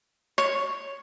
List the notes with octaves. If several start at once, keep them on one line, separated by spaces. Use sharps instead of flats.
C#5